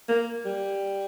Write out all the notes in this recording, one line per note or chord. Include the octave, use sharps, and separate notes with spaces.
A#3
G3